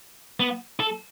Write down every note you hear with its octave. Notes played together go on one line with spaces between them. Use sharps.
B3
A4